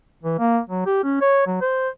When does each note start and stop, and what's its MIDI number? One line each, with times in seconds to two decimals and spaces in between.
0.23 0.38 52
0.39 0.60 58
0.69 0.85 54
0.86 1.01 67
1.03 1.19 61
1.21 1.44 73
1.46 1.59 54
1.61 1.89 72